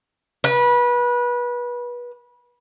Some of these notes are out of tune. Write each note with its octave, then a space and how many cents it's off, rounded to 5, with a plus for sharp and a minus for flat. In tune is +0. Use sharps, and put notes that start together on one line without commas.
B4 -25